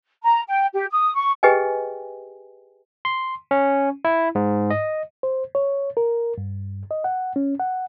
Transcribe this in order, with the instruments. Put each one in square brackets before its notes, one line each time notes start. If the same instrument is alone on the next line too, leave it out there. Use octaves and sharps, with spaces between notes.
[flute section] A#5
G5
G4
D#6
C#6
[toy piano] G4 G#4 B4 D#5 G5 G#5
[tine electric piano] C6
C#4
E4
G#2
D#5
[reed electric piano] C5
C#5
A#4
G2
D#5
F#5
C#4
F#5